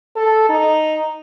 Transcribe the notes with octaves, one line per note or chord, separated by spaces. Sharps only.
A4
D#4